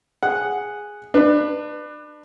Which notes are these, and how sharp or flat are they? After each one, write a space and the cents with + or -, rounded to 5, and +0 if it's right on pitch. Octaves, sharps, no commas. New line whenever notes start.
G#4 -5 F#5 +0
D4 +30 B4 +0